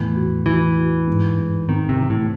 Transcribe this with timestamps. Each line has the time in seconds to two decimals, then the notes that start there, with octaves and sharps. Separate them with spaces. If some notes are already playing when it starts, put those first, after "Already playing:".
Already playing: E2 A2 E3
0.16 F#4
0.46 E3 F#4
0.78 F#4
1.07 G#2
1.38 G#2
1.69 D#3 C4
1.89 C3
2.00 E3
2.10 A2